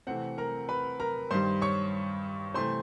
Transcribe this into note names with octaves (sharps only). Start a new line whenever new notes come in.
C3 E3 A3 C4 F#5
A#4 A#5
B4 B5
A#4 A#5
G2 D#3 G3 C5 C6
C#5 C#6
C3 E3 A3 C5 C6